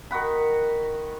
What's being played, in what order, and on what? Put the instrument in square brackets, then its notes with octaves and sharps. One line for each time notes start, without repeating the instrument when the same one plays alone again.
[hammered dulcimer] D#3 F#4 F#5 B5